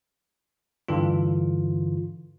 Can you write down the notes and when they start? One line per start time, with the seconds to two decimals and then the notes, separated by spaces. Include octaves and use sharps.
0.88 G2 D3 E3 F4